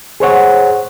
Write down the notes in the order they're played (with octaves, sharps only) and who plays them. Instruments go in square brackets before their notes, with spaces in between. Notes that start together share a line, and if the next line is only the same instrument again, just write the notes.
[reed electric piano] G#4 C5 C#5 F#5